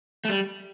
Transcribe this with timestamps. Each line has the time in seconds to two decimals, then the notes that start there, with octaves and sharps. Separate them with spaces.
0.25 A3
0.29 G3